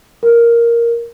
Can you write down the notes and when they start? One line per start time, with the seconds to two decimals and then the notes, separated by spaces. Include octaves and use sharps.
0.23 A#4